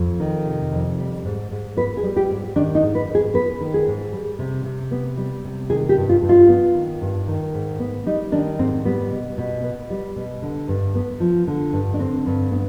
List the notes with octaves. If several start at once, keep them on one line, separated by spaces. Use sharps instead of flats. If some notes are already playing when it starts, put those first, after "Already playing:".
Already playing: F2
D#3
C3
F2
G3
G#2
G#2
B3 B4
G#4
G3
G4
G#2
D#3 D4
D#4
G#2
B4
G#2
G#4
B3 B4
D#3
G#4
G#2
G3
C3
C3
B3
G3
C3
D#3 G#4
G4
G2
F4
G2
F4
B3
D#3
G2
D#3
G#2
B3
G3 D#4
D#3 D4
G#2 C4
G3 B3
B2
B2
B3
G3
B2
D3
G2
B3
F3
D3
G2
D4
D3 C4
G2
B3